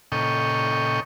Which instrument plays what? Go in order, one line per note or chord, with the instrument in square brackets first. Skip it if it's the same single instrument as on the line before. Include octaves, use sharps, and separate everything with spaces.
[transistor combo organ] A#2 C#3 A4 D#5 G5 C#6